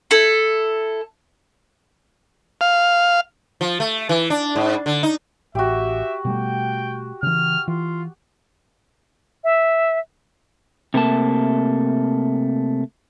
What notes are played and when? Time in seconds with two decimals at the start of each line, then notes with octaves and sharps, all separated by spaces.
0.11 E4 A4
2.61 F5
3.61 F3
3.80 A3
4.09 E3
4.30 D4
4.56 G#2
4.86 D3
5.03 D#4
5.55 A1 F#4 G4 E5
6.25 B2 G3 A3 G5
7.23 C#3 E3 F6
7.68 E3 F4
9.44 E5
10.94 C3 A3 A#3 A5